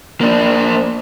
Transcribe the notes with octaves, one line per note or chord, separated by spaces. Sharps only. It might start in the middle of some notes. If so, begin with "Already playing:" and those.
A#3 D4